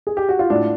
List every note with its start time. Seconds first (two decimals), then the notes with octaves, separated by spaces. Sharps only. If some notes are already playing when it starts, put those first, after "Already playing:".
0.07 G#4
0.17 G4
0.29 F#4
0.39 F4
0.50 A2 D4 E4